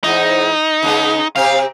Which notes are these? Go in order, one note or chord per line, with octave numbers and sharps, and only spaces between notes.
E2 G#2 D#4 E4
C#3 G#3 B3
C3 C4 G4 F5